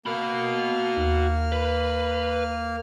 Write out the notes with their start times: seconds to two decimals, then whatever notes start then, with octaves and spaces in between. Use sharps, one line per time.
0.06 A#3 F#4 B5 F6
0.96 D#2
1.52 B4